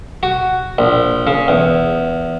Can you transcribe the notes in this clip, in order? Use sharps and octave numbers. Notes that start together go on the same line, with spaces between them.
F#4
A#1
C#3
E2